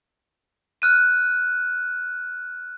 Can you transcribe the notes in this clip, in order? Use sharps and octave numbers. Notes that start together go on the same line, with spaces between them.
F6 F#6 D#7